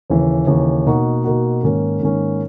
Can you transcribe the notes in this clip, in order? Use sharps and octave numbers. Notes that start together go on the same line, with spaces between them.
D#2 C#3 E3
D#2 C#3 E3
B2 A#3 D#4 F#4
B2 A#3 D#4 F#4
G#2 D#3 A#3 C#4
G#2 D#3 A#3 C#4